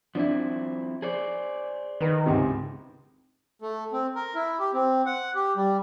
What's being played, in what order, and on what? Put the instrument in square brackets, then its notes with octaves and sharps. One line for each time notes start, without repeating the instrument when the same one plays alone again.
[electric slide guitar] F3 C4 E4 [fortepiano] D4
[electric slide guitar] G#4 C5 D5
[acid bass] D#3 [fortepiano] A#4 B4
[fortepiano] C#2 G#2 C3
[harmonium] A3
C4
A#4
E4
G4
C4
F#5
G4
G3